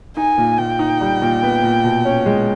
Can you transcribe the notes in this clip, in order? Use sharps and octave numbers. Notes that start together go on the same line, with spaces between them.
D#4 G#5
A#2
A#2 G5
D#4
G3
A#2
B3
A#2
B2
C#4
G#3